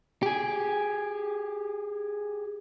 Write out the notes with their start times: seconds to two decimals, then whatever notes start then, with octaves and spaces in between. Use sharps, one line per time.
0.23 G4 G#4